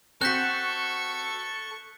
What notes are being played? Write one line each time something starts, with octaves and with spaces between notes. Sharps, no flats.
C4 F#4 A4 C#6 F#6 G6 B6